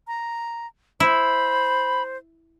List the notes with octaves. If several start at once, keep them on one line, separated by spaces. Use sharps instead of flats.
A#5
E4 C5 B5